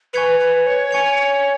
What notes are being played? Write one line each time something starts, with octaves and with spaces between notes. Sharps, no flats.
B4 G#5 C#6 G#6 C#7 F7
B4
C#5
G#5 C#6 G#6 C#7 F7